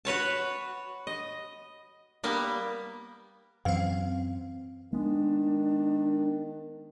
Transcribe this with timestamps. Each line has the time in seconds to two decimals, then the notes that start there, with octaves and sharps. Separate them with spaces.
0.05 F#4 B4 C#5 A5
1.07 D#5
2.24 G3 A#3 B3
3.65 F#2 E3 C4 F5
4.93 D#3 G#3 B3 D4